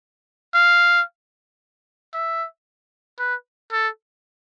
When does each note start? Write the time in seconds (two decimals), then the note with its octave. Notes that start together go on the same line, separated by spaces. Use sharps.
0.54 F5
2.14 E5
3.19 B4
3.72 A4